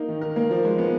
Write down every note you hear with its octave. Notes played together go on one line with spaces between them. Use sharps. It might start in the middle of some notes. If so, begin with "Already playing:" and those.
Already playing: A#3 D#4 A#4
D#3
A#4
A#3
F3
G#3
B3